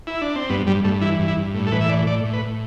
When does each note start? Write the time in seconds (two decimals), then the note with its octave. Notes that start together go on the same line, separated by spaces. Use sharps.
0.07 E4
0.22 D4
0.36 C4
0.50 G2 B3
0.67 G2 G3
0.84 G2 A3
1.01 E3 E4
1.19 G2
1.28 E4
1.37 G2
1.54 A2
1.67 A4
1.72 E3 B4
1.81 E5
1.89 A2 D5
2.07 A2 D5
2.25 A2
2.33 B4
2.42 A2